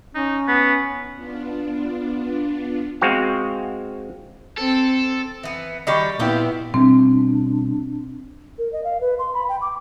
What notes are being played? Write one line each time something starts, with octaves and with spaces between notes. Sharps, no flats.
C#4 D#4
B3
B3 D4 F4
G#3 C4 F#4 F5
C4 A4
E3 B3
D#3 G3 G4 D5 B5 C#6
A#2 B3 C4 E4 F4 G4 G5
B2 G3 C4 D4
A#4
D#5
F5
B4
C6
B5
G5
D6